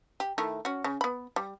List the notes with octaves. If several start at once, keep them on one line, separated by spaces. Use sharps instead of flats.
G4
D#3 A3 E4
C#4 F#4
C#3
B3 B5
G3